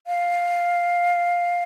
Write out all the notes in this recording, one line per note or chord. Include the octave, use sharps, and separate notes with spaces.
F5